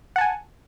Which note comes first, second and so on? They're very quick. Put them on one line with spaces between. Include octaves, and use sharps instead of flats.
F#5 A5 G#5